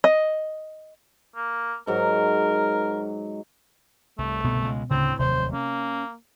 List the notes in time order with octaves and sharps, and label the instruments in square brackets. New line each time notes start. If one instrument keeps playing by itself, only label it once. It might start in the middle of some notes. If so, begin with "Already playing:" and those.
[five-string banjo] D#5
[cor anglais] A#3
[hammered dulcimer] G#2 F#3 [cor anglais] A#4
[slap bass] C2 G2 [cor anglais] A3
[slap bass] C2 G2 D3 [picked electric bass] B2 B3
[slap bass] C#2 D#3 G#3
[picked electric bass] D2 C#3 [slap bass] A2 [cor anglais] C4
[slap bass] F1 D#2 F#3 [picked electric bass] C3 [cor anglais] C5
[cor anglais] A#3 [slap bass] C#4